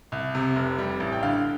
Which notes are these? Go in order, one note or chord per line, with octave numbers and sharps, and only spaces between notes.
C2
C3
F1
G3
A1
G5
D3 F5